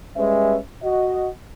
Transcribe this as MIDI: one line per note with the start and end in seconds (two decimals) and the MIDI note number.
0.17 0.57 55
0.17 0.57 56
0.17 0.57 61
0.17 0.57 71
0.17 0.57 76
0.83 1.28 66
0.83 1.28 75